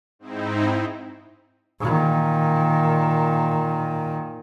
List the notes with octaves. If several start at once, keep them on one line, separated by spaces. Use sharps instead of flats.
G#2 C4 D#4 E4
A#2 D#3